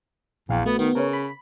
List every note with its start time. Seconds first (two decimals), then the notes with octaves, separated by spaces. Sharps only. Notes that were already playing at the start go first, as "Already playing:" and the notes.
0.49 A#1 E2 F5 G5
0.66 A3 B3 F#4
0.79 D#3 B3
0.95 C#3 A#4 B4 C#5
1.13 B5